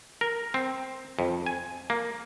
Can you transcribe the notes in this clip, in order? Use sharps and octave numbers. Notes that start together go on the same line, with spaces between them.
A#4
C4
F2
G#5
A#3